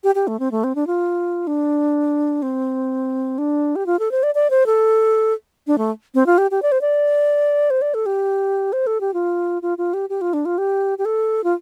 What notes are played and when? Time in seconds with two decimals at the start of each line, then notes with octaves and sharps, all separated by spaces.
0.04 G4
0.15 G4
0.27 A3
0.40 C4
0.51 A3
0.64 C4
0.75 D4
0.87 F4
1.47 D4
2.42 C4
3.38 D4
3.76 G4
3.86 F4
3.99 A4
4.11 C5
4.23 D5
4.35 D5
4.50 C5
4.66 A4
5.67 D4
5.78 A3
6.15 C4
6.26 F4
6.38 G4
6.51 G4
6.62 D5
6.72 C5
6.81 D5
7.70 C5
7.82 D5
7.94 A4
8.06 G4
8.73 C5
8.87 A4
9.01 G4
9.14 F4
9.62 F4
9.78 F4
9.94 G4
10.10 G4
10.21 F4
10.33 D4
10.45 F4
10.58 G4
10.98 G4
11.05 A4
11.44 F4